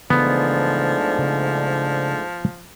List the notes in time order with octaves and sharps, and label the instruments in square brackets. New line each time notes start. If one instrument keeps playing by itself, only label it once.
[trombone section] G#2 A3 D4 [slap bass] C#3 E3 [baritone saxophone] F3 [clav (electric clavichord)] B3
[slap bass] C#3 A#3